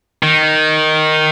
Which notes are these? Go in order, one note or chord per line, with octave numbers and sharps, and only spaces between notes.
D#3